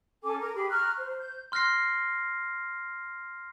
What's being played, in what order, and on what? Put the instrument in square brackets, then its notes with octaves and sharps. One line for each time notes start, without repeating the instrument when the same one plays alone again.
[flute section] C#4 A4 G#5 D6
A#4 A#5
G4 G#4 B5
A#5 C#6 F6 F#6
C5
G6
[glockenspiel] C6 F6 F#6 A#6 C7